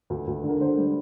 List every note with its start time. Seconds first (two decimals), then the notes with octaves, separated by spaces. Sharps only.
0.10 D2
0.27 D2
0.44 D3
0.49 A#4
0.60 D3 C5
0.77 G3